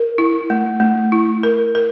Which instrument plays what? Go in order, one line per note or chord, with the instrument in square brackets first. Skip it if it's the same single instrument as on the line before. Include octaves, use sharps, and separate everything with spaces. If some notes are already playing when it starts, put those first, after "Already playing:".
Already playing: [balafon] A#4
E4
A3
A3
E4
A#4
A#4